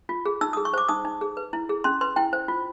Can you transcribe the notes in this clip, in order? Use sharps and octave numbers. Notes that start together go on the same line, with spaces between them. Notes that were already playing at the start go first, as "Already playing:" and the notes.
F4
G#4
D#4 E6
G#4 D#6
C#6
C5 D6
D#4 D#6
D#4
G#4
B4
E4
G#4
C#4 C6
B4 C6
E4 G5
C5
F4